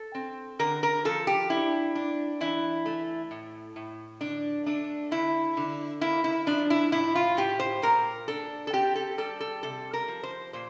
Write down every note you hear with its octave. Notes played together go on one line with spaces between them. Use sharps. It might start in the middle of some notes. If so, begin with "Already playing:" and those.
Already playing: A4
C4
D3 A#4
A#4
F3 A4
G4
D4 E4
D4
E3 E4
A3
A2
A2
D3 D4
A3 D4
D3 E4
D3
A#3 E4
E4
F3 D4
E4
A2 E4
F4
A2 G4
C5
A#2 A#4
D4 A4
A4
C4 G4
A4
G3 A4
A4
C3 A4
A#4
F3
C5
A#2 C5